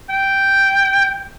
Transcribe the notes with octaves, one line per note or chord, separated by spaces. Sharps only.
G5